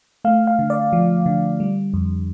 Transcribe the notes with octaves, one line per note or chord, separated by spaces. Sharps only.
A3 F5
F5
D3
D5
F3
D3
G3
F2